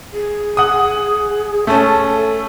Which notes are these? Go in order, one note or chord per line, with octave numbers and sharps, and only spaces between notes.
G#4
F#5 D#6
A3 C#4 A5
A4